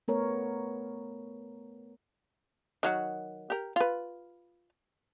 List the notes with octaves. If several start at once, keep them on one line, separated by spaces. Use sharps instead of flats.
A3 B3 A#4 C#5
D#3 F#3 F#4
G4 A#4
F4 B4